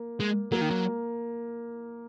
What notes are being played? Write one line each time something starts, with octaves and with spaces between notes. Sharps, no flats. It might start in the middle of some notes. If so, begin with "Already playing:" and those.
Already playing: A#3
G#3
F#3 A#3
D#3
F#3